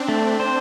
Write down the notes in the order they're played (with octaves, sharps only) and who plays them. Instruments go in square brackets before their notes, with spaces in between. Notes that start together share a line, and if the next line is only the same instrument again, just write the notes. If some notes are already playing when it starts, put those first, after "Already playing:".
Already playing: [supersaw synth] C4 D4
[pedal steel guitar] A3
C5